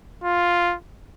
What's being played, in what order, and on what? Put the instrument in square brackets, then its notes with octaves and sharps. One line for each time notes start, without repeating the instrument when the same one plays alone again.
[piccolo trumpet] F4